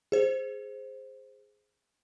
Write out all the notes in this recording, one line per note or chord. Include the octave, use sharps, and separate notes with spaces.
G#4 C5